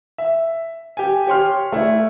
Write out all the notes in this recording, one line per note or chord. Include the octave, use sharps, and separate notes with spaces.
E5
G4 G#5
G4 C#5 C6 F6
A3 E4 D5